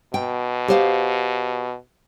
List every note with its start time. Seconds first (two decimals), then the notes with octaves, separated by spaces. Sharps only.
0.14 B2 G5
0.68 G4 C5 F5